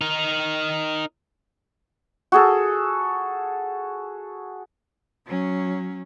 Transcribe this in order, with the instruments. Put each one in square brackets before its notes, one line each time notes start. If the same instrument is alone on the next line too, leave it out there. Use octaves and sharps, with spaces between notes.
[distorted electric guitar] D#4 A#4
[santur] F#4 G#4 A4
[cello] F#3 C#4